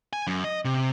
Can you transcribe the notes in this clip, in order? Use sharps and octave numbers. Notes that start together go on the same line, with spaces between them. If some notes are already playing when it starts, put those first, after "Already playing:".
G#5
F#2
D#5
C3